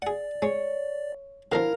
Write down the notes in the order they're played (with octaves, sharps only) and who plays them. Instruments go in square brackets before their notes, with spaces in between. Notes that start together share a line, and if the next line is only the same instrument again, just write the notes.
[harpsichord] G#4 F#5 [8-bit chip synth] D5
[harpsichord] G#3 [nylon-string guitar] C#5
[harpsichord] B2 D3 F3 [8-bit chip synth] E4 [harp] A#4 F5